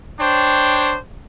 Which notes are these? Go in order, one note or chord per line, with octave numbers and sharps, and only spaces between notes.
D4 C5 C#5 G5